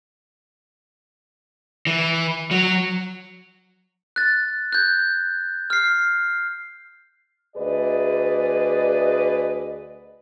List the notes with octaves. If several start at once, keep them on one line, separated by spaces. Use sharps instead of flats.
E3
F#3
F#6 A6
F#6 G6
F6 C7
D2 G#4 B4 D5 D#5